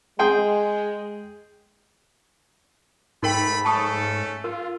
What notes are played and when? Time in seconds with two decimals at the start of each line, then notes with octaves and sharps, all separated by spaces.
0.19 G#3 G#4 G5 C6
3.23 G#2 A3 D#4 A#4 G5 B5
3.65 A3 C#4 A4 A5 C#6 D#6
4.44 F4 A#4